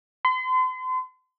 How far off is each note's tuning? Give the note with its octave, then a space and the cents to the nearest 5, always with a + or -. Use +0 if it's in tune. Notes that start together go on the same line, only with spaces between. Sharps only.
C6 -40